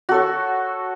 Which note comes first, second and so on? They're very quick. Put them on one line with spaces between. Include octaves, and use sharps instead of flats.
F#4 A4 C#5